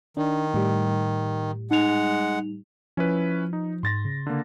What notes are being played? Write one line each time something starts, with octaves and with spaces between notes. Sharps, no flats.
D#3 D4
A2 G3
G#3 D#4 F#5 F7
F3 C#4 E4 B4
D#4
G#2 C6 A6 A#6
C#3
D3 A#3